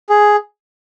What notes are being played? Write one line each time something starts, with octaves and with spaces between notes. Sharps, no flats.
G#4